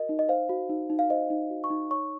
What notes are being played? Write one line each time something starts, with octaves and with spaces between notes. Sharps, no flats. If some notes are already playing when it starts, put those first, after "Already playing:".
Already playing: F#4 A#4 D#5
D#4
D#5
C5 F5
F#4
D#4
D#4
F5
C5 D#5
D#4
F#4
C#6
D#4
C#5 C#6